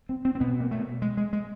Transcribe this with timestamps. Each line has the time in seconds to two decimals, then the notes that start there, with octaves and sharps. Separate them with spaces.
0.09 C4
0.25 C4
0.35 C4
0.40 B2 B3
0.60 A#3
0.71 A3
1.02 G#3
1.17 G#3
1.33 G#3